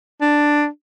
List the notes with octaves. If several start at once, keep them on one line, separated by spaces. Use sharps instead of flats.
D4